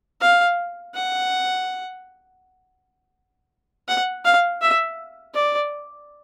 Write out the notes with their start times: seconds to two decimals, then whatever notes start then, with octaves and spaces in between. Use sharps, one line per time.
0.21 F5
0.95 F#5
3.88 F#5
4.25 F5
4.62 E5
5.35 D5